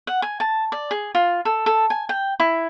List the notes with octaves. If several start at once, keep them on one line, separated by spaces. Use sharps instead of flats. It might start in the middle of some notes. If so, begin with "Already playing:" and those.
F#5
G#5
A5
D5
G#4
F4
A4
A4
G#5
G5
E4